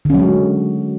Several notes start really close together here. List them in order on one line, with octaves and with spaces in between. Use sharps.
D3 C#4 F#3 G#3